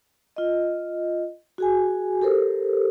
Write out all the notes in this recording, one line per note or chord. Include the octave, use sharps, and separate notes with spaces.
F4 D#5
F#4 G#4 G#5
G4 A4 A#4 C5